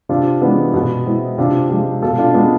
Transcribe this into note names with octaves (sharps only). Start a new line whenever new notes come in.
C3 D4 F4
E3 G#3 B3 D4
B2 B3
G#3 C4 E4
C3 D4 F4
F3 G#3
B2 F4 A4
D4 F4
G#3 B3 D4